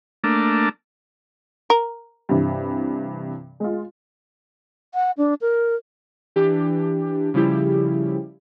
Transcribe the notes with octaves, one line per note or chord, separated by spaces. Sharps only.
A3 A#3 D4
A#4
G2 C3 E3
G#3 F4
F#5
D4
A#4
E3 D4 G4
C#3 F3 G3 E4 G4